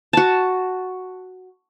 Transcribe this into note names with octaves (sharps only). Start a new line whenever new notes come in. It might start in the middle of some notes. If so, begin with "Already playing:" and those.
F#4 A5